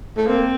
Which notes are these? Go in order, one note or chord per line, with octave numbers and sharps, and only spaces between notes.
A3
A#3 C4